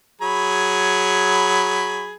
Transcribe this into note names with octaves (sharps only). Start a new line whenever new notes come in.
F#3 G#4 B5